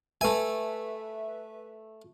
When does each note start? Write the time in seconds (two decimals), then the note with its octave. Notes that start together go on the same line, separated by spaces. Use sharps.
0.21 A3 B4 E5 G#5